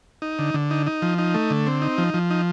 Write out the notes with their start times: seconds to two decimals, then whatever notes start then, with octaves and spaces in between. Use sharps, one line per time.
0.22 D#4
0.39 D3
0.54 D3
0.71 D#4
0.86 D#4
1.02 F3
1.18 D#4
1.34 A3
1.50 D3
1.66 C4
1.82 D#4
1.98 F3
2.14 F3
2.30 D#4